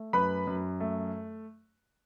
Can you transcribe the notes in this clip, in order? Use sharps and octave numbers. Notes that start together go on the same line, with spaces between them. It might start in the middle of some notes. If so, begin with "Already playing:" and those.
Already playing: A3
F#2 B4 B5
F#2
A3